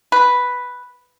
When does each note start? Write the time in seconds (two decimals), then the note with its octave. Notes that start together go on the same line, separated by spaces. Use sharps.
0.12 B4